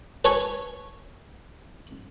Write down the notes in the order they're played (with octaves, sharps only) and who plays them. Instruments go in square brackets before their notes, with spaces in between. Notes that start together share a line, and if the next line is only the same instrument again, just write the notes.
[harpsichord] B4 C#5 G#5 A5 B5 C#6